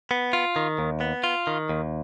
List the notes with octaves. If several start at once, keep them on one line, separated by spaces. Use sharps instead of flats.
B3
F4
D#3
D#2
B3
F4
D#3
D#2